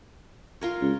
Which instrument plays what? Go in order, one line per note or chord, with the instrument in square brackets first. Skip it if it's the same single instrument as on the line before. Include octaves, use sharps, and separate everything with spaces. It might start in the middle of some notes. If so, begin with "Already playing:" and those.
[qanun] F4 A#4 C#5
[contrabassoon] C#2